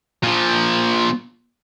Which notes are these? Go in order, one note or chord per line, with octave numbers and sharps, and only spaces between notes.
A#2 F3